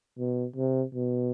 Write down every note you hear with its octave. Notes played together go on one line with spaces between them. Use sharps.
B2
C3
B2